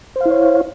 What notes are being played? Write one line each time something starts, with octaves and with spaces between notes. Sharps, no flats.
E4 C5 C#5 F5